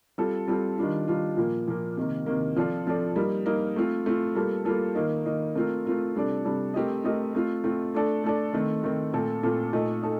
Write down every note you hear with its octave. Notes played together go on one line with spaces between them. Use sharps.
G3 C4 F4 A4
G3 C4 F4 A4
D#3 G3 D4 F4
D#3 G3 D4 F4
A#2 F3 A#3
A#2 F3 A#3
C3 D#3 A#3
C3 D#3 A#3
F3 C4 F4 A4 D5
F3 C4 F4 A4 D5
G3 A#3 D#4 A#4
G3 A#3 D#4 A#4
A3 C4 F4
A3 C4 F4
G3 A#3 F4 A4
G3 A#3 F4 A4
D#3 A#3 D#4
D#3 A#3 D#4
A3 C4 F4 A#4
A3 C4 F4 A#4
C3 G3 D4 A4 D5
C3 G3 D4 A4 D5
A3 C4 G4 A#4 D#5
A3 C4 G4 A#4 D#5
A3 C4 F4
A3 C4 F4
A3 D4 A4 D5
A3 D4 A4 D5
D#3 A3 C4
D#3 A3 C4
A#2 A3 C4 F4 A4
A#2 A3 C4 F4 A4
A#2 A3 D#4 A4 D#5
D#4 A4 D#5